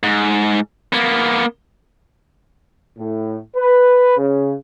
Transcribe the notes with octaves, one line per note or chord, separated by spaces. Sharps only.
G#2
A#3 B3
A2
B4
C#3